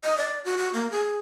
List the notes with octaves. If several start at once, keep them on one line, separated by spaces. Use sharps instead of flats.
D#5
D5
F#4
F#4
A#3
G#4